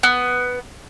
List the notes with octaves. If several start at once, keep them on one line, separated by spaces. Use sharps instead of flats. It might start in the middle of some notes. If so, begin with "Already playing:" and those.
B3